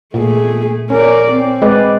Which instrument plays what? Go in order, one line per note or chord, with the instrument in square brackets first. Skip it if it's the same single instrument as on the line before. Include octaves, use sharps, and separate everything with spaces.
[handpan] A#2 [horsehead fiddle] A3 G#4
[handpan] C#4 [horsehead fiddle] A#4 D5
[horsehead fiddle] C4
[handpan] G#3 B4 D5